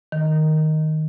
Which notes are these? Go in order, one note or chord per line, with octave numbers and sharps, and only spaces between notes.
D#3